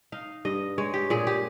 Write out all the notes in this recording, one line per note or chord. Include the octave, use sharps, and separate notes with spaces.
D#4 F5
G2 D#5
G#3 C#5
G4
A#2 G#4
G4